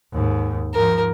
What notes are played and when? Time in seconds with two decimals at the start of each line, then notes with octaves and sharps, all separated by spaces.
0.13 D#2 G#2
0.74 G#2 F3 A#4